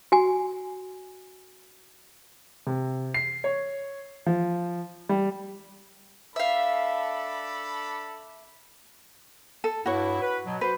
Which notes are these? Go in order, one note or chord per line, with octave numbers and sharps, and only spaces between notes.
F#4 G#5
C3
C7
C#5
F3
G3
D4 A4 E5 F5 B5
A4
G2 E4 F#4 C#5
B4
B2 F#3
F#4 B4 C5